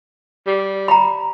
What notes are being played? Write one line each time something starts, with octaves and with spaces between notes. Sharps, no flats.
G3
A#5 B5